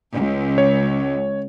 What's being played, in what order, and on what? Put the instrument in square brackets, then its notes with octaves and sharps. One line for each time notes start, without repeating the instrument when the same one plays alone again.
[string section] C#2
[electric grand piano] C#5